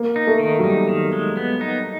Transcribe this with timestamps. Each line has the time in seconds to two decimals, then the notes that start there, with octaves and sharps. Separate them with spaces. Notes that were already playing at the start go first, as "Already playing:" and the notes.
Already playing: A#3
0.16 D#4
0.27 A3
0.39 D#3
0.59 F#3
0.63 G3 D#4
0.89 D#3
1.13 G#3
1.37 B3
1.61 D#4